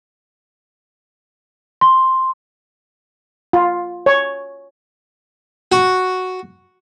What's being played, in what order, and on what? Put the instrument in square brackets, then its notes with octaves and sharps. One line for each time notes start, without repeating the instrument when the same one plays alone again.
[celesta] C6
[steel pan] F4
C#5
[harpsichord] F#4